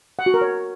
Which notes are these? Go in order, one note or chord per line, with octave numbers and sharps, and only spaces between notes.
F#5
F#4
A#4
C#5